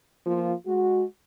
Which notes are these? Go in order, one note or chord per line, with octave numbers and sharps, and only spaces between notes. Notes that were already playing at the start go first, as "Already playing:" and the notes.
F3 A#3 F4
G#3 F#4